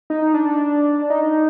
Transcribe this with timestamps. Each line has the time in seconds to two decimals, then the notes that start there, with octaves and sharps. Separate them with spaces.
0.10 D#4
0.34 D4
1.10 D#4